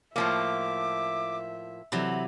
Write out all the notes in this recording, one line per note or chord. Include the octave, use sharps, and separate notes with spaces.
A2 F3 A#3 E5 D6
C3 E3 F#3 B5